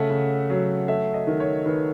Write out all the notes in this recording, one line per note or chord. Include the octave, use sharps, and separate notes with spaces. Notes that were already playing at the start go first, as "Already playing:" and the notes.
Already playing: C#3 A3 E5 F#5
C#3
F#3
A3 E5
D#5
D#3
C#5
D#3 B4